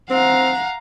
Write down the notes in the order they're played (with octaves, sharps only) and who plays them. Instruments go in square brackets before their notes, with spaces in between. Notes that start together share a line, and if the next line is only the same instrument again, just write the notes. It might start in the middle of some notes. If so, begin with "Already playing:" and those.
[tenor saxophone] C4 [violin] F5 A#5 [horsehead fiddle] F#5